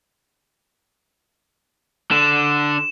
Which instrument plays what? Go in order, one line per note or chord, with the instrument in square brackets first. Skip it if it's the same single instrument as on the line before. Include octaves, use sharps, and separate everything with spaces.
[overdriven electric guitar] D3 [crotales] E7